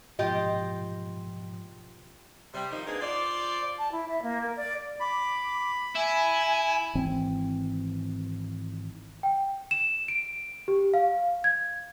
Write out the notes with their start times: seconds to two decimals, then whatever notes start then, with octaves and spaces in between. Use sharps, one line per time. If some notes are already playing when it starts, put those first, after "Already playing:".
0.19 G#2 B2 F3 F4 G4 D#5
2.54 C3 G3
2.71 D#3 F3 C4 D#4
2.86 A#3 B3 D4 G#4
3.02 F4 C5 D5
3.78 A5
3.92 E4
4.09 E5
4.22 A#3
4.43 A#4
4.57 D5
5.00 B5 D6
5.96 E4 G#5
6.95 G#1 E3 C4
9.23 G5
9.71 E7
10.08 D7
10.68 G4
10.94 F5
11.44 G#6